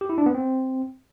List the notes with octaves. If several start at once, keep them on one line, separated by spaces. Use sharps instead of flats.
G4
E4
D4
B3
C4